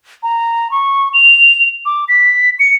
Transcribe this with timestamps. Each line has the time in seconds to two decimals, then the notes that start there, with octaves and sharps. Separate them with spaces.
0.23 A#5
0.71 C#6
1.14 F7
1.86 D6
2.08 B6
2.59 C#7